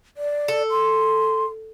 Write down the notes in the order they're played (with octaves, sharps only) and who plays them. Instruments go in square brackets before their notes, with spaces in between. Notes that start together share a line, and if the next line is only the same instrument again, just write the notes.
[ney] D5
[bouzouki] A4
[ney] C6